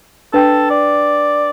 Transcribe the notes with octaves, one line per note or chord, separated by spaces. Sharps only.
D4 A4 B4 G5
D5